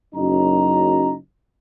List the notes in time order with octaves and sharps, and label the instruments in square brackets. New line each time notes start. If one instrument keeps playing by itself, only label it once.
[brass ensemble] F#1 F#2 F#3 D#4 A#5